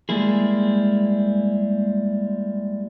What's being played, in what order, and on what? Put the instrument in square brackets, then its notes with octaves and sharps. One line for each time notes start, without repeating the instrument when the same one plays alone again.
[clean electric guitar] G3 G#3 A#3 E4 G#4